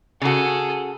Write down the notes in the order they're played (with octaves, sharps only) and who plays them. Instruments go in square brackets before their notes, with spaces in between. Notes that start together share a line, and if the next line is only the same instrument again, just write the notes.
[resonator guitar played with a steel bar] C#3 F#4 [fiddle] G#4 A4